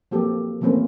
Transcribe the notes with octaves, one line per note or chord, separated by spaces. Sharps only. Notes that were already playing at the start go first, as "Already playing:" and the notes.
F3 F#3 A#3 C4 G4 A4
E3 F3 A3 A#3 C4 C#4